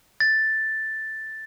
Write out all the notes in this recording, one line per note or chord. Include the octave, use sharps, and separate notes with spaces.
A6